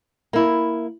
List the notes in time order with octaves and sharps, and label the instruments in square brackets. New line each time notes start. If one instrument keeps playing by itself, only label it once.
[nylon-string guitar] A#3 E4